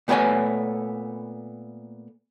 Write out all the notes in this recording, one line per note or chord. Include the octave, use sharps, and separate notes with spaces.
A#2 A3 B3 G#4 C#5 G#5